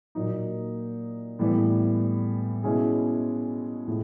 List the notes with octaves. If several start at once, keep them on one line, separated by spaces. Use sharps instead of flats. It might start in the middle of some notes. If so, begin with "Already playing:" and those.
A#2 F#3 A#3 D#4
A2 E3 G3 B3
B2 G#3 C#4 E4 G#4
A2 F3 G#3